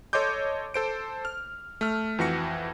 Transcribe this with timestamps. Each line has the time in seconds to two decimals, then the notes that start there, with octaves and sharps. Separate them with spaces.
0.13 A4 C#5 D#5 C6 D6 G6
0.74 A4 C5 D7
1.25 F6
1.81 A3 F6
2.19 F2 E3 F#4 A#6 C#7